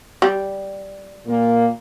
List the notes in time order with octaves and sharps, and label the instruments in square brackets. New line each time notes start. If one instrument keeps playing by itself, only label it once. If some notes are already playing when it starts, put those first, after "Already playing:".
[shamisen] G3
[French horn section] A#2 A#3